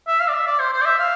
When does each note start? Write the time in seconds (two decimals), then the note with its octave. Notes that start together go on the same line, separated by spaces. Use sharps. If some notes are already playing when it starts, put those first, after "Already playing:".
0.08 E5
0.20 F5
0.28 D5
0.34 E5
0.47 D5
0.59 C5
0.73 C5
0.81 D5
0.85 E5
0.99 F5